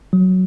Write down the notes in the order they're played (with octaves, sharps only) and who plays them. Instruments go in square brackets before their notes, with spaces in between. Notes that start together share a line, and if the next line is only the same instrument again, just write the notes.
[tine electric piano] F#3